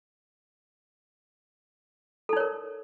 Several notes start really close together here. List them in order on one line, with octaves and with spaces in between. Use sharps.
A4 D#4 C#5 A#4